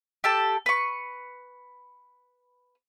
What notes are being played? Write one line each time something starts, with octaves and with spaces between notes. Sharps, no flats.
G4 A4 A5
B4 C#6